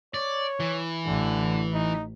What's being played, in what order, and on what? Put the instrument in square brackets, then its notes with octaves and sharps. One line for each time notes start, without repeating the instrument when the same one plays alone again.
[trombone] C#5 [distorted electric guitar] D5
[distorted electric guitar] E3
[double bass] A1 [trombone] D3
[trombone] D#4